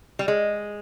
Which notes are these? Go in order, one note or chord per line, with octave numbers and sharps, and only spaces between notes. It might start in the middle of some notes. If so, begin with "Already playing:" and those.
G3
G#3